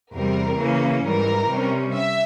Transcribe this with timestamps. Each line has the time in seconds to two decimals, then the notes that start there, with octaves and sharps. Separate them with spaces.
0.14 E2 C3 G3 A#4
0.59 C#3 E3 A#3 C#4
1.05 G#2 E3 G3 A#4
1.50 C3 G3 C#4
1.95 E5